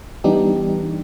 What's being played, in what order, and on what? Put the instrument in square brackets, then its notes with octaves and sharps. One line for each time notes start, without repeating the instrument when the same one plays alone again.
[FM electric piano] E3 G3 B3 D4 D#4 G4